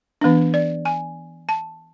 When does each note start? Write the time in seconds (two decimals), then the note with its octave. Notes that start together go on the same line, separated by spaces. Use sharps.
0.21 E3 B3 D4
0.54 D5
0.85 G#5
1.49 A5